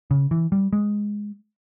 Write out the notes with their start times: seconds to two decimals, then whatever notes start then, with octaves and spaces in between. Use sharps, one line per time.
0.11 C#3
0.31 E3
0.52 G3
0.73 G#3